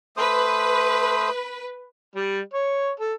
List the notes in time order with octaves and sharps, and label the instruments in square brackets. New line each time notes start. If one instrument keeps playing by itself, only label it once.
[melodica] A3 C5 D#6 [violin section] B4
[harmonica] G3
C#5
A4